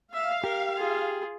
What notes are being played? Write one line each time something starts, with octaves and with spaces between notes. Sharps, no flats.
E5 F5
G4 A#4
F4 G#4